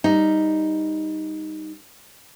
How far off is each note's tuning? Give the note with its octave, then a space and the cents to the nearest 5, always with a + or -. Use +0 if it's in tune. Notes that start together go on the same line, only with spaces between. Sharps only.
G3 +10 D#4 +0